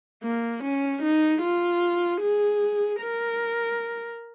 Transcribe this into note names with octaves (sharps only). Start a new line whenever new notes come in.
A#3
C#4
D#4
F4
G#4
A#4